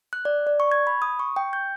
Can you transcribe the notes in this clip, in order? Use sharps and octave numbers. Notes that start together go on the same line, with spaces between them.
F#6
D5
D5
C#6
G#6
B5
D#6
C#6
G5
G6